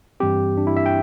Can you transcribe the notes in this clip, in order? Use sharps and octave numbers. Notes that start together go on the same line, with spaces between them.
G2 E3 G3 C4 G4
D4
E4
E5
G5